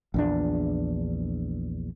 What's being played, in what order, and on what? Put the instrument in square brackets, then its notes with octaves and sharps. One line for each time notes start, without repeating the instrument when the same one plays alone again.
[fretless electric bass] A#1 E2 D4